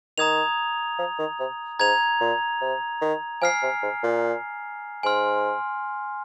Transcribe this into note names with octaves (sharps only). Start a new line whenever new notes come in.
D#3 A#5 D#6 G#6 F7
F3
D#3
C3
G#2 A#5 G#6 F7
A#2
C3
D#3
F3 G#5 F6 C7
C3
G#2
A#2
G#2 G#5 C6 F6